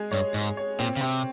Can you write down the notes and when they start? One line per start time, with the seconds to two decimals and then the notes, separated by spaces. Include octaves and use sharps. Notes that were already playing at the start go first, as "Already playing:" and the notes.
Already playing: G#3 G#4
0.11 G2 C#5
0.34 G#2 C#5
0.57 C#5
0.79 A#2 C4
0.97 C#3
1.01 C3 C4